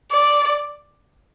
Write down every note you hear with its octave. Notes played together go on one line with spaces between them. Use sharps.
D5